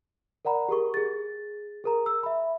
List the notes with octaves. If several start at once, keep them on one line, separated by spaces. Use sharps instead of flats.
A#4 D5 F#5 A#5 B5
G4 G#4 A#4 C#6
G#4 A6
G#4 A#4 A#5
E6
E5 B5